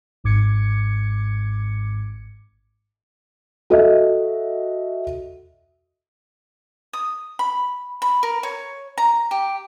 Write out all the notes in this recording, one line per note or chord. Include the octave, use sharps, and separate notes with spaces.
G#1 G#2 D6 G#6 C#7
F#4 A4 D#5 E5
D#6
B5
B5
A#4
C#5
A#5
G4